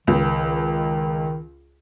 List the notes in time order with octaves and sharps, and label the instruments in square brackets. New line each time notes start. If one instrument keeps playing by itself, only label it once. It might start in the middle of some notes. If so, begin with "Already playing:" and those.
[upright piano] C#2 [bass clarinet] D#3